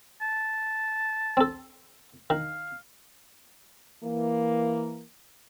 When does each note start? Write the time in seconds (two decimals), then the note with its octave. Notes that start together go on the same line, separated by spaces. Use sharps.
0.21 A5
1.37 C4 A4
2.30 D#3 F5
4.03 E3 A#3